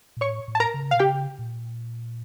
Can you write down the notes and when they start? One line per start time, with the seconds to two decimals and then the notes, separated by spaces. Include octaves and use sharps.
0.17 A#2
0.21 A2 C#5 C#6
0.48 A2
0.55 A5
0.60 A#4 A#5
0.74 C#3
0.91 A#2 F5
0.99 C#3 G4 G5
1.39 A#2